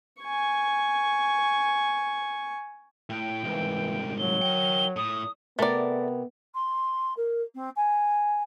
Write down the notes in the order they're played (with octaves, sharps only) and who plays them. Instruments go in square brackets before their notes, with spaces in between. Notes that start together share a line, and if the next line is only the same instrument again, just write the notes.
[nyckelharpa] G#5 C#6
[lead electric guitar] A2 [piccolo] G5
[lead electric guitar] C2 G#2 [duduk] E3
[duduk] F#3 [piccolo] G7
[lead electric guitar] A#4 G5
[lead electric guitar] A2 [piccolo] D#6
[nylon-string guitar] C3 A#4 [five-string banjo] A3 D5 [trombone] B3
[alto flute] C6
A#4
C4
G#5